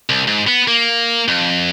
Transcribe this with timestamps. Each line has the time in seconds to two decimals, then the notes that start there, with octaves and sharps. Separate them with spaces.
0.09 C2
0.27 G#2
0.48 B3
0.68 A#3
1.28 F2